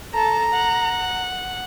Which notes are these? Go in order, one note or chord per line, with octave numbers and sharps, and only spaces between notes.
A4 A5 A#5
F#5